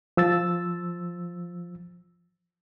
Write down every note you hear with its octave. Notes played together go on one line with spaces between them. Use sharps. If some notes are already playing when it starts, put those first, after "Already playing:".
F3 E6 A6